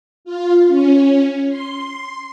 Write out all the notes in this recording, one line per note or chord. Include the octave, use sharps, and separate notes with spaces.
F4
C#4
C6